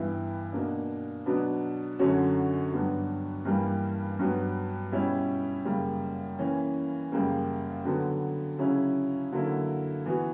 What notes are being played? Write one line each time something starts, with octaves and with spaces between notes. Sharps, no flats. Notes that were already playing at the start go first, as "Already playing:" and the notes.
Already playing: G2 E3 B3 E4
B2 A#3 D4
B2 F#3 B3 D4
F#2 D3 F#3 C#4 F#4
G2 F#3 B3 D4 F#4
G2 E3 G3 A#3
G2 F#3 B3
B2 G3 C#4 E4
F#2 C#3 G3 A#3
E3 A#3 C#4
F#2 C#3 G3 A#3
D3 F#3 B3
C#3 F#3 C#4 E4
D3 F#3 A#3 E4
E3 B3 F#4